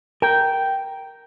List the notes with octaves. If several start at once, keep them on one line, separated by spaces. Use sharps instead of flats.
A#4 G5